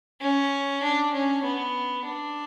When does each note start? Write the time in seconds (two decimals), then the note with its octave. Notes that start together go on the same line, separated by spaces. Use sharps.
0.21 C#4
0.83 D4
1.13 C#4
1.44 B3
2.05 D4